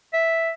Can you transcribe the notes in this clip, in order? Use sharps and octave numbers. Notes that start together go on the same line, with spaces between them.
E5